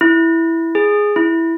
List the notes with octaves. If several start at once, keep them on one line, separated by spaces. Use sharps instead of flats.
E4
G#4
E4